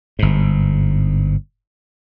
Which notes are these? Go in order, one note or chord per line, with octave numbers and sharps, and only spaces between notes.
G1 G#2